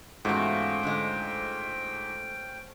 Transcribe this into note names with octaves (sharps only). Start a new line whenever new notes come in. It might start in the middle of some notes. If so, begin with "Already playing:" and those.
E2 G#2 F3 A3 C#4 F#4 G5
D3 G#3